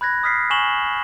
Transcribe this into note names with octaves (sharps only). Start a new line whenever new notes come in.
B5 F#6 G#6 A#6
D#6 F6 B6 C7
G#5 C#6 E7 F#7 G7